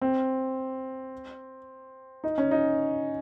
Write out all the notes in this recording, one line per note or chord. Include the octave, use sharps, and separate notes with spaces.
C4
D#4
C#4
D#4